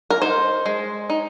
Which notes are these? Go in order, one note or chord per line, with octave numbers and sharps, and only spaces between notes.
A#4
D#4 C5
G#3
D#4